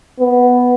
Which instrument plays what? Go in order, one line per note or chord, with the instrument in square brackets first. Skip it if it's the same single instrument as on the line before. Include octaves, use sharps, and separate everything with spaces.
[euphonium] B3